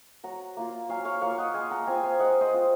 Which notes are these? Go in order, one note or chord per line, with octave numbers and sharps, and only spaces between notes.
F#3 F#5 A#5
A#3 F4
F#3 F5 G#5
C#5 F5
A#3 F4 C#5 F5
D#5 F#5
G#3 F5 G#5
F#5 A#5
C4 F4 F5 G#5
F5 G#5
G#3 D#5 F#5
C5 D#5
C4 F4